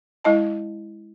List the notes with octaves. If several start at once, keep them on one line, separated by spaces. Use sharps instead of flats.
G#3 E4 D#5 A5